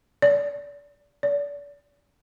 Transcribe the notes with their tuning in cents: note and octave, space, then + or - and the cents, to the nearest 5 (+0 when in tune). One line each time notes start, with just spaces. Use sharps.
D5 -30
D5 -35